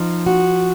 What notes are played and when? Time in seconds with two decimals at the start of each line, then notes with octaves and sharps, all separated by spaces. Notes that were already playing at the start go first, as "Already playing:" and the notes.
Already playing: F3 D#4
0.26 F#4